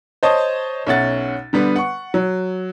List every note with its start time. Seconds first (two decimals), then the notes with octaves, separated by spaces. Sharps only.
0.23 C5 C#5 D#5 A5
0.87 B1 C#4 E5 F#5 A6
1.53 D3 G3 B3 B4
1.76 F#5 C#6
2.14 F#3